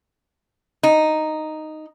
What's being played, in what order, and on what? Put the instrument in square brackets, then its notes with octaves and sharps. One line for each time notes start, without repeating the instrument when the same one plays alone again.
[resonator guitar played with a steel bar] D#4